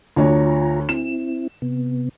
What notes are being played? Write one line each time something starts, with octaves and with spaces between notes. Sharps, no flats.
D2 D4 F4 C#5 A#5
C4 E4 E7
C3 B3